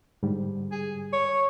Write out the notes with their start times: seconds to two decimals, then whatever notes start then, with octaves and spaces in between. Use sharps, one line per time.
0.23 G#2 D3 G3
0.72 G#4
1.13 C#5